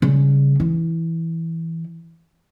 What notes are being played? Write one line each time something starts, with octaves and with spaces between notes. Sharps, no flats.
C#3 G3
E3